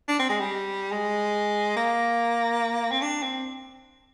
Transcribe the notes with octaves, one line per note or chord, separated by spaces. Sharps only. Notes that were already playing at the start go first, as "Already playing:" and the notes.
D4
C4
G#3
G3
G#3
A#3
C4
D4
C4